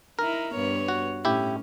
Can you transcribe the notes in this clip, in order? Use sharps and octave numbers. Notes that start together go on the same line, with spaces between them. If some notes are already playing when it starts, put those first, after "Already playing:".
D#4 E4 A#4
G2 B3 C#5
F#4
A2 C#4 E4 G4